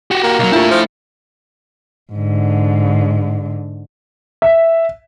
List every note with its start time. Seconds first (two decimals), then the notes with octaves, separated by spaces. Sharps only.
0.11 F#4 G4
0.23 A#3
0.39 B1 F#3
0.52 A3 D4 E4 F4 G4
0.71 F3
2.13 G#2 D3
4.42 E5